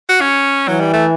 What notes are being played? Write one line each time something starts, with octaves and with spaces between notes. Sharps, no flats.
F#4
C#4
E3 F#3
G3
A3